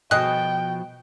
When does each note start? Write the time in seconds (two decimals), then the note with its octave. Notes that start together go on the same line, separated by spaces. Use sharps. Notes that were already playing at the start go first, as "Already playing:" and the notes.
0.11 B2 F3 G#4 A4 D#5 G5 F#6